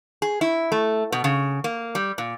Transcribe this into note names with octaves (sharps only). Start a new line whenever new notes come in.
G#4
E4
A3
B2
C#3
A#3
G3
A#2